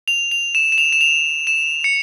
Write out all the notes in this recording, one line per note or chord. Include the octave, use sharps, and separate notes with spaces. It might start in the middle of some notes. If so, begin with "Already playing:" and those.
F7
F7
E7
E7
F7
E7
F7
E7
C#7